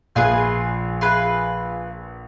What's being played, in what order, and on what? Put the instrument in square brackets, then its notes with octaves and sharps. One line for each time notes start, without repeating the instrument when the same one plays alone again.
[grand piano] A#1 A#2 [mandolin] F4 G#4 B4
[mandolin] F4 G#4 B4